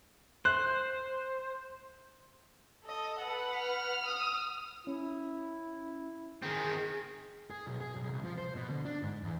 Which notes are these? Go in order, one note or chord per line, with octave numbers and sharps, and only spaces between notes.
C5 F#6
A4 D#5
B4 F#5
F6
D#6
C#4 E4
D#3 C4 G#4
G#4
B1
G#4
B1
C2
F3
C5
B2
D3
D4
G#2
E2